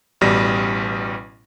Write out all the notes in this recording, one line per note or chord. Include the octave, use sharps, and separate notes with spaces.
A1 B2 G3 A#6